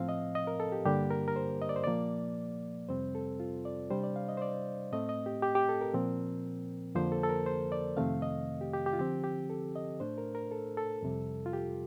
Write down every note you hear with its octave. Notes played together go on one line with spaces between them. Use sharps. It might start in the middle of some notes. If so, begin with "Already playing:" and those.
Already playing: A2 F3 C4 F5
D#5
D#5
A#4
A4
G4
G2 D3 G3 A#3 D4 G4
A#4
A#4
C5
D#5
D5
C5
A#2 F3 A#3 D5
F2 C3 G3 C4 C5
A4
F4
D5
C3 G3 D4 C5
D5
F5
D#5
C5
D5
A2 A3 C4 D#5
D#5
G4
G4
G4
A4
A#4
A#2 F3 C4
F2 D3 F3 A#3 C5
A4
A4
A#4
C5
D5
F2 C3 D#3 A3 C4 F5
D#5
G4
G4
G4
F4
D3 F3 C4 G4
G4
A4
D#5
A2 A3 D4 C5
A#4
A#4
A4
A4
F2 C3 G3
F4
G4